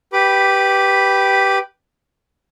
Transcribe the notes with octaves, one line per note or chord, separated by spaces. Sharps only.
G4 B4 B5 D6